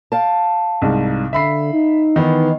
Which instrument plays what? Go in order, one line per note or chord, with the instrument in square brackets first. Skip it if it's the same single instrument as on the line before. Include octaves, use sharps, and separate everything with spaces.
[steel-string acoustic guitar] F5 G5 A5
[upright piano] C2 G#2
[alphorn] D3 [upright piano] E5 B5 C7
[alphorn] D#4
[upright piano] D#3 E3 B3